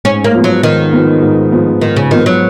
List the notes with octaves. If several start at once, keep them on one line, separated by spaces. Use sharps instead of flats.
G#2 C#4
A#3
F3 B3
F#3
G#2 D#3
F3 B3
G#2
F3 B3
G#2 D#3
C#3
D#3 F3 B3
F#3